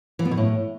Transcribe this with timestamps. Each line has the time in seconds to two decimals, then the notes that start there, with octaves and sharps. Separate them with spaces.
0.19 E3
0.25 B3
0.31 B2
0.37 A2